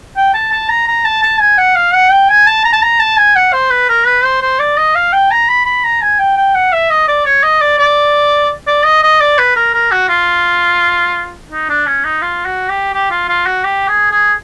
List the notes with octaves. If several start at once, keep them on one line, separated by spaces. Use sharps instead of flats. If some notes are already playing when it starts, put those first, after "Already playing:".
G5
A5
A5
A#5
A#5
A5
A5
G#5
F#5
F5
F#5
G5
G#5
A5
A#5
A5
A#5
A5
G#5
F#5
C5
B4
A#4
B4
C5
C5
D5
D#5
F5
G5
A#5
B5
B5
A#5
G#5
G5
G5
F#5
E5
D#5
D5
C#5
D#5
D5
D5
D5
D#5
D#5
D5
B4
A#4
A#4
F#4
F4
D#4
D4
C#4
D#4
F4
F#4
G4
G4
F4
F4
F#4
G4
G#4
G#4